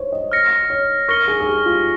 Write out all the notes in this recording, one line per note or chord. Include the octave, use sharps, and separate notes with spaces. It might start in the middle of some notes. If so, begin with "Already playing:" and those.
Already playing: C5 C#5
D#5
F6 A#6 C#7
C#5
A#4 C#6 F6 A#6 C#7 G7
G#4
G#4
G4
F4